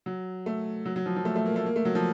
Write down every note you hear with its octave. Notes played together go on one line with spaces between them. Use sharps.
F#3
A3
F#3
F#3
F3
F3
A3
A3
A#3
A3
A#3
A3
F#3
F3